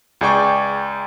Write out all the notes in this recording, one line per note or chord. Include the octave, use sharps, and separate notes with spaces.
C#2 G#4 D5 G5 C#6